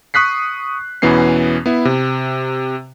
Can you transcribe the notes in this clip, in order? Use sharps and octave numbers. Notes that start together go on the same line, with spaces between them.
C#6 D#6 F#6 B6 C7
E2 B2 E3 B3 C#4 C7
B3 E4
C3